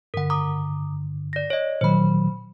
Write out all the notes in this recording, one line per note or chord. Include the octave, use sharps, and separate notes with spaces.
G2 D3 A#4 F#5
A#5 D6 D#6
D5 A#6
C#5 D#5
A#2 D#3 F#3 C5 B5